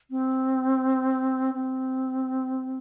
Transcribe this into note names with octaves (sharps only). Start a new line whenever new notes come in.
C4
C4